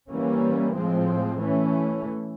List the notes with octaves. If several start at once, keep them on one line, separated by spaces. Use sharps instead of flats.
E3 G3 A#3 C#4
A2 F3 G#3 C4
E3 A3 C#4